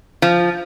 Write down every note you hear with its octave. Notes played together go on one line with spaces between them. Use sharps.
F3